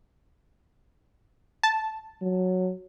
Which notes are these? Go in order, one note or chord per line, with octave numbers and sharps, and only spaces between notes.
A5
F#3